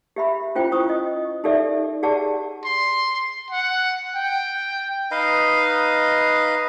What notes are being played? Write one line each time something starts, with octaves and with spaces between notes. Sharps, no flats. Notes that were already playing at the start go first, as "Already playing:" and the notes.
G4 E5 B5
C#4 E4 F4 C5 G5
F4 C5 C#6 D#6
D#5
D#4 G4 A4 D5 E5
G4 G#4 D5 F#5 A5
C6
F#5
G5
D#4 B4 D#5 F5